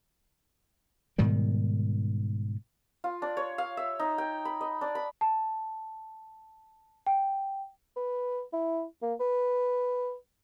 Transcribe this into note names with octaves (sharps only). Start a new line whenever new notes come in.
G#2 B2 D#3 G3
F4
D4
C#5
F5
E5
D#4
G5
B5
D#5
D4
B5
A5
G5
B4
E4
A#3
B4